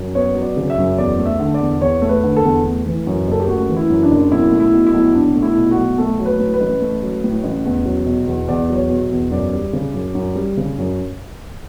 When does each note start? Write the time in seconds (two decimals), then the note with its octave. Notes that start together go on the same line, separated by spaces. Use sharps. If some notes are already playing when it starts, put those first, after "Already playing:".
Already playing: F#2
0.15 B3 C#5
0.35 F#3
0.42 D5
0.57 C#3
0.70 E5
0.78 F#2
0.98 E2 D5
1.18 A3
1.26 E5
1.40 D3
1.54 D5
1.60 E2
1.81 E2 C#5
2.02 A3
2.09 B4
2.24 D3
2.37 A4
2.44 E2
2.65 A3
2.86 E3
3.07 F#2
3.28 F#1 A4
3.40 G4
3.48 A3 F#4
3.69 E3
3.77 E4
3.90 F#2
4.03 D4
4.11 F#1
4.31 B1 E4
4.52 A3
4.60 E4
4.74 B2
4.87 E4
4.94 B1
5.15 B1 D4
5.36 A3
5.43 E4
5.57 B2
5.71 F#4
5.77 B1
5.98 A3 A4
6.19 F#3
6.25 B4
6.39 A2
6.54 B4
6.60 A1
6.82 A3
7.02 F#3
7.24 A2
7.44 A1
7.65 E2
7.86 F#3
8.06 B2
8.27 E2
8.48 E2 D5
8.70 F#3
8.76 C#5
8.90 B2
9.11 E2
9.31 F#2 D5
9.53 G3
9.73 C#3
9.94 F#2
10.15 F#2
10.36 G3
10.57 C#3
10.78 F#2